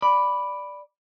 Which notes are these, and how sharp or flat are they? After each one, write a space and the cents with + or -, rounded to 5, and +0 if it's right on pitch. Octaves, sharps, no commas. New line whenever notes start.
D5 +0 B5 +0